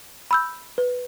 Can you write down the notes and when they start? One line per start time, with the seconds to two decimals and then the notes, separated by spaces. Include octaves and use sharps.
0.31 B5 E6 G6
0.78 B4